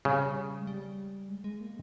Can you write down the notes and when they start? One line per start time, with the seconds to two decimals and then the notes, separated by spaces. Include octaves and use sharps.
0.05 C#3 G3
0.59 G#3
0.67 G3
1.29 G#3
1.44 G#3
1.61 A#3